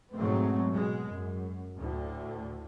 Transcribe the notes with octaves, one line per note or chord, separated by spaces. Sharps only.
G#2 B2 F#3 G#3 A3 C4
B2 G#3
F#2
D2 A2 D3